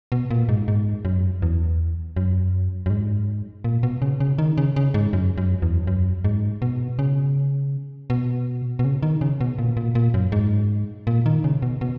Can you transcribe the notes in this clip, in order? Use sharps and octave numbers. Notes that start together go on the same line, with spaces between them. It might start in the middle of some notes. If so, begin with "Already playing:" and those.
B2
A#2
G#2
G#2
F#2
E2
F#2
F#2
G#2
A#2
B2
C#3
C#3
D#3
C#3
C#3
G#2
F#2
F#2
E2
F#2
G#2
B2
C#3
B2
B2
C#3
D#3
C#3
B2
A#2
A#2
A#2
F#2
G#2
A#2
D#3
C#3
B2
B2